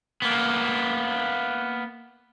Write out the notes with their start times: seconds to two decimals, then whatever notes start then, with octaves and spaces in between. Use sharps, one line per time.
0.22 A#3 B3